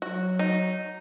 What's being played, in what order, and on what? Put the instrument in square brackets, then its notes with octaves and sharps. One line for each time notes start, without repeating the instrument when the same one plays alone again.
[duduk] F#3 [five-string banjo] F#4
[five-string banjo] D#4